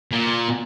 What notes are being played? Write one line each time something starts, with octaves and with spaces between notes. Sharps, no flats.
A#2